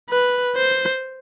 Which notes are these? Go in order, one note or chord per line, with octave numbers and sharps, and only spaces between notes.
B4
C5